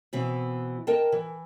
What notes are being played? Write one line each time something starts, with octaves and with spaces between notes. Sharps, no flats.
B2 E3 C4
A#4 D#5 G5 A5
E3